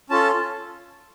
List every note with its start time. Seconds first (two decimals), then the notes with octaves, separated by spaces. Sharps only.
0.10 C#4 F4 A4 A5